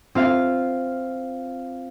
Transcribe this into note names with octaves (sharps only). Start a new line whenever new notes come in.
C4 F4 F5